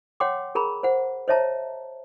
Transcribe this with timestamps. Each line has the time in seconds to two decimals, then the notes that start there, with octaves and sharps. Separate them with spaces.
0.20 C#5 F#5 G5 C6 D6
0.55 G#4 A#4 A#5 B5
0.83 C5 F#5
1.28 C5 C#5 D#5 E5 A5 A#5